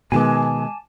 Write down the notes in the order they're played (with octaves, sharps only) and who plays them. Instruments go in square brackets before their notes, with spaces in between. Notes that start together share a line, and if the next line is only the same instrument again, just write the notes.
[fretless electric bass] B2 D#3 B3 [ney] G#3 [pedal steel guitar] G#5 A5 D6